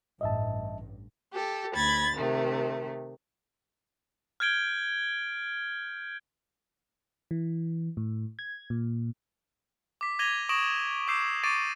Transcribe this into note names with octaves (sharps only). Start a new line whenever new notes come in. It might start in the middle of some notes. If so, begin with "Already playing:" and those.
A1 G2 D#5 E5 A5
G4 A4
D2 B5 G#6 A6
C3 D#3 A3
F6 G6 G#6 D7 G7
E3
A2
G#6
A#2
D6 B6
D6 G#6 A#6 D#7 F7 G7
C#6 D#6 A#6 D7 E7 F#7
D6 E6 G6 C7 E7
C#6 D6 A6 C7 D7 D#7